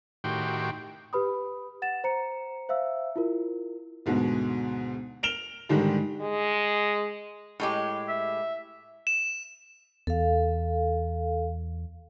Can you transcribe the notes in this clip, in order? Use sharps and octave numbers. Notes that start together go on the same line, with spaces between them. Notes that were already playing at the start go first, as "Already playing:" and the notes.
A2 D#3 F#4 G4 G5 C6
G4 B4 B5 D#6
F#5 A6 E7
C5 A#5 C#7
C5 E5 F5 E6
E4 F4 A#4
D2 G#2 B2 G#3
F6 D7 E7 F7 G7
G#2 D3 D#3 G3 G#3 G4
G#3
A2 G#3 G4
E5
E7
E2 A4 F5